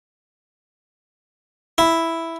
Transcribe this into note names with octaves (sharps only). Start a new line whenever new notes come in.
E4